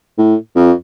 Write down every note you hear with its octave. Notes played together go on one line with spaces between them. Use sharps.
A2
F2